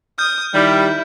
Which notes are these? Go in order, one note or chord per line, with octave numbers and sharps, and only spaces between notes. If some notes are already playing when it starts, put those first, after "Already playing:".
D#6 F6 G6
D#3 G3 E4